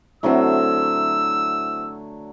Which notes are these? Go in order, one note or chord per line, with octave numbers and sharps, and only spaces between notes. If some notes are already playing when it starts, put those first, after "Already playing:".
D3 F#3 A3 C4 E4 E6